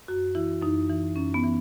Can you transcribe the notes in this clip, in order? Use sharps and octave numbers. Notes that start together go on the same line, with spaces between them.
F#2 F#4
E3 E4
F#2 D#4
E3
F#2 C#4
B3
E3